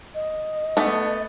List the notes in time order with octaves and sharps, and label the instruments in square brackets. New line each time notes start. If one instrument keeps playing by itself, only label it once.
[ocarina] D#5
[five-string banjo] A3 B3